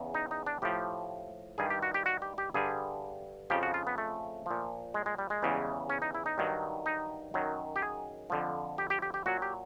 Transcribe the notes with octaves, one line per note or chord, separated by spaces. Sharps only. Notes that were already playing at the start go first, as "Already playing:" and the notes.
Already playing: E2 C#3
D#4
D#4
D4
A2 F3 G4
G2 D#3 G3 G#4
G4
F#4
G4
F#4
G4
G4
G2 D3 G3 G#4
F2 C#3 F3 G4
F#4
F4
B3
A3
A#2 F3
G#3
G#3
G3
G#3
E2 C#3 E3 G3
C#4
D#4
E4
D#4
G2 D#3 F#3
D#4
F#2 D#3 F#3
G4
G#4
F2 D3 F3
G4
G4
G4
G4
A#2 F#3 F#4
G4